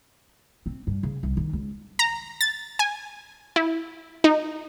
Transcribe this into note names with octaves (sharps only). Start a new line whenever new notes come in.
C4
G2
C#3
C2
D#3
C#2
A#5
A6
G#5
E4
D#4